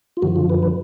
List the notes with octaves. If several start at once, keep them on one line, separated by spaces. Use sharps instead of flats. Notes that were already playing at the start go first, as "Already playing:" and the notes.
F4
F#2 D3 F3 F#4
F4
B4
B4